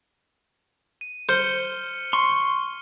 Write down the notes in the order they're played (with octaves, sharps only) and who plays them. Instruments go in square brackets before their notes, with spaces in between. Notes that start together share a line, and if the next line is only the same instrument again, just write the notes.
[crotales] D#7
[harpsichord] C5 [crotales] F6 C#7 G7
[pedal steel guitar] C6 C#6